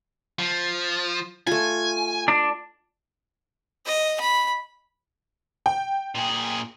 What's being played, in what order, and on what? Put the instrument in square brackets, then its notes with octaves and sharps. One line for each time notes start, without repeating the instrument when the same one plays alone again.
[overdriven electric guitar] F3
[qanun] A3 F4 [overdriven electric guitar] G#5
[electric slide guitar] D4
[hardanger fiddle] D#5
B5
[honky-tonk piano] G5
[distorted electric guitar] A#2 G#4